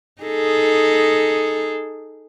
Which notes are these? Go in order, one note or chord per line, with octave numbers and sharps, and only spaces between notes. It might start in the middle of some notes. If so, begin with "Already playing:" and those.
D#4 G#4 A4